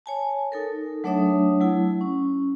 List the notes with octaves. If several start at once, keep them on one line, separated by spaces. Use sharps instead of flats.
C#5 G#5 A5
D#4 A4 A#4
F#3 A3 D4 C#5 E5 D#6
F#3 A3 E4
C#4